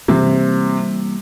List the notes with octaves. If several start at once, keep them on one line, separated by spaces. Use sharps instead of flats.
C3 E3 G3 A#3